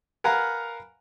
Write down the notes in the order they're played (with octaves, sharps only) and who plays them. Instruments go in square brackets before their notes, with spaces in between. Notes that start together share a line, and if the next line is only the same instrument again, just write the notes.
[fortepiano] A#4 B4 F5 F#5 G#5 A#5